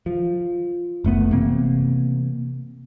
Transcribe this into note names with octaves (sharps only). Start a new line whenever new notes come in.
F3
F#1 A3 B3
C3 E3 A#3 C4